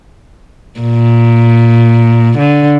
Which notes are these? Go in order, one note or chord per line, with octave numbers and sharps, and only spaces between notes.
A#2
D3